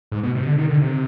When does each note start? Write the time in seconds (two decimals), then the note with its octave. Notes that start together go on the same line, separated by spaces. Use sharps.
0.12 G#2
0.23 B2
0.35 C3
0.46 D3
0.58 D#3
0.70 D3
0.81 C3